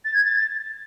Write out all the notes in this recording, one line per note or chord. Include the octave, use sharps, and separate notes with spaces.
A6
G#6
A6
A6